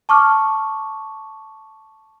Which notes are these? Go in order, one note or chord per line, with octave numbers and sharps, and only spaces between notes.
A5 C#6 D6 F6